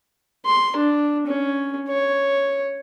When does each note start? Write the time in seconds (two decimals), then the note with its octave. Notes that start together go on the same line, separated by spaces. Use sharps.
0.46 C6
0.76 D4
1.27 C#4
1.88 C#5